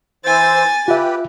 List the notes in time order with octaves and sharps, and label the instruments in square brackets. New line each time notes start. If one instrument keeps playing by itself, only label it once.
[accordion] E3 C5 E6 [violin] G#5 A6
[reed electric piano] F4 E5 [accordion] G4 B4